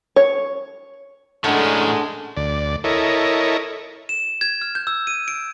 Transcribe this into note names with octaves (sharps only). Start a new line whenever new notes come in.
C#5
A2 G#3 A3 C#4 D4 A#4 F#5 A5
D2 D5
E4 A4 A#4 C#5 D#5
E7
G#6
F6
G6
E6
D#7
D7